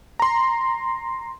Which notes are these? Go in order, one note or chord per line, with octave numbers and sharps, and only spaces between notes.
A#5 C6